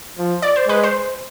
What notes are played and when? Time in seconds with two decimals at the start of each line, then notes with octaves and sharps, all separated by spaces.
0.18 F3
0.42 D5
0.56 C5
0.67 G#3 B4
0.83 C5